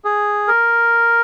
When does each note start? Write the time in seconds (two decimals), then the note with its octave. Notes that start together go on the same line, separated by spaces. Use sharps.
0.05 G#4
0.48 A#4